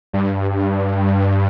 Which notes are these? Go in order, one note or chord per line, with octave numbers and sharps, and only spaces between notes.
G2